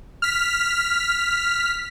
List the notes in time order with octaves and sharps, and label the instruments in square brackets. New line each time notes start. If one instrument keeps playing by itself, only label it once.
[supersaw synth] F6 B6